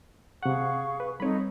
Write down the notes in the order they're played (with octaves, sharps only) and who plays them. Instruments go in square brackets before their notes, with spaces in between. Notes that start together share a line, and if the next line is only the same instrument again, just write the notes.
[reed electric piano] C3 F#5 [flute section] G#4 F5 C#6
[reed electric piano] B4
[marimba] G3 C4 [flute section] D#4 A4 [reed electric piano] C#5 B5